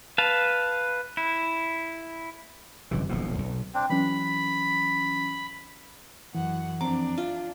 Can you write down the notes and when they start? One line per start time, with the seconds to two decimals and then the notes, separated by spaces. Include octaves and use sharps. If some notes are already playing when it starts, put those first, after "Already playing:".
0.18 B4 F5 A5
1.17 E4
2.91 G1 F#2 C3 E3
3.09 D#1 B1 A2 F3
3.38 B1
3.74 C4 D4
3.90 E3 F#3 C#4 B5
6.35 F#2 E3 F#5
6.81 F2 C4 D4 A#5 D6
7.18 F4 E5